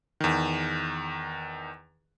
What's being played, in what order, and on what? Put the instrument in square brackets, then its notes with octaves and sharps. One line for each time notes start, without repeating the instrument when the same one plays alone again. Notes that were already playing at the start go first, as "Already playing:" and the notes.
[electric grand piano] E2 D#3